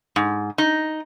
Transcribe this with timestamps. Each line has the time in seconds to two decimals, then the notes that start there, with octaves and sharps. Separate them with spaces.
0.16 G#2
0.58 D#4